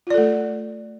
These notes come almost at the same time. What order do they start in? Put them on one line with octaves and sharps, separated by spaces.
F4 D5 A4 A3